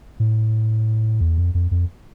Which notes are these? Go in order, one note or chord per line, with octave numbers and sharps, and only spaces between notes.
A2
E2
F2
F2
F2